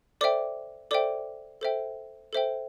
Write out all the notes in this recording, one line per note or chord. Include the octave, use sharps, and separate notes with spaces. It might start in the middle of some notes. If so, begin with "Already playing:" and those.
A4 C5 D5 E5 G5 D6
A4 C5 D5 E5 G5 D6
A4 C5 E5 G5
A4 C5 E5 G5